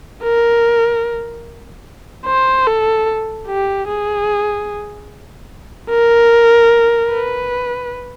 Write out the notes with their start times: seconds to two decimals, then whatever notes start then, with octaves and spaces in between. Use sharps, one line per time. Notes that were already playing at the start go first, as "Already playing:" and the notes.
0.24 A#4
2.26 C5
2.67 A4
3.48 G4
3.89 G#4
5.90 A#4
7.12 B4